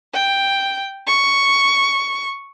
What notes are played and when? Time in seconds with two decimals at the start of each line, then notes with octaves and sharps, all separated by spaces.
0.13 G5
1.07 C#6